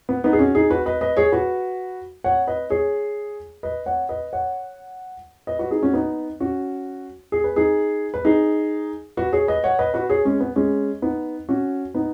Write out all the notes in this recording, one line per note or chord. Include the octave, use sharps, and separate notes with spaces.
B3
B3 D#4
G#4
C#4 F#4
D#4 G#4
F#4 B4
B4 D#5
B4 D#5
G#4 C#5
F#4 B4
C#5 F#5
B4 D#5
G#4 C#5
B4 D#5
C#5 F#5
B4 D#5
C#5 F#5
B4 D#5
F#4 B4
D#4 G#4
C#4 F#4
B3 D#4
C#4 F#4
G#4
B4
D#4 G#4
B4
D#4 G#4
F#4 B4
G#4 C#5
B4 D#5
C#5 F#5
B4 D#5
F#4 B4
G#4 C#5
G#3 C#4
B3
G#3 C#4
B3 D#4
C#4 F#4
B3 D#4